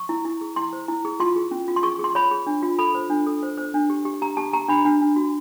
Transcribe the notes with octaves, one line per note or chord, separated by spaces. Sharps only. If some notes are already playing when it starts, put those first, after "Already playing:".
Already playing: C#6
E4
E4
G#4
E4 C6
C5
E4
G#4
F4 C6
G#4
C#4
F4
C6
G#4 C#6
G#4 C6
C#5 B5
G#4
D4
F4
A4 B5
C5
D4
A4
C5
C5
D4
G4
G4
G4 A#5
G4 A5
G4 A#5
D4 B5
D4
D4
F#4